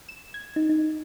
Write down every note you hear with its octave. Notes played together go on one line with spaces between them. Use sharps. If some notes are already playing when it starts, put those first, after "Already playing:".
E7
G#6
D#4
D#4